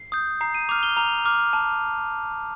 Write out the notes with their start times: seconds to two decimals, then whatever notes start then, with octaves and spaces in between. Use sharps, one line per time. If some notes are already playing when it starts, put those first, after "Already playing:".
Already playing: C7
0.12 D#6 G6
0.41 A#5 C7
0.54 D#7
0.69 D6 F6 F7
0.83 G7
0.97 A#5 F7
1.25 D6 F6
1.53 A5